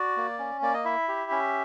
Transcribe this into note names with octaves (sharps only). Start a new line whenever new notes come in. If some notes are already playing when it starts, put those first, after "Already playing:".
Already playing: F#4 D5
A#3
C#4
A#3 D5
D#5
E4 E5
G4
C#4